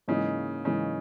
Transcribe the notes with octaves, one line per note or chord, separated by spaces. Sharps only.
G#2 C#3 E3 A#3 D#4
G#2 C#3 E3 A#3 D#4